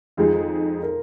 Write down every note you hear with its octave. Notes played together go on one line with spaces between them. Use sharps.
F2 D#3 G#3 D#4 F4 G#4
A#4